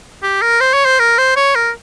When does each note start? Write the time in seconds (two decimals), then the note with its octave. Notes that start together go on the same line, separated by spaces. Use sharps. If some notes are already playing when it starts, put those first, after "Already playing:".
0.23 G4
0.42 A#4
0.61 C5
0.74 C#5
0.85 C5
0.99 A#4
1.18 C5
1.36 C#5
1.55 A#4